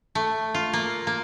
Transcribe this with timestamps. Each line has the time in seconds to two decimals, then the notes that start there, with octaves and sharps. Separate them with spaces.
0.15 A3
0.54 F4
0.73 A#3
1.07 A#3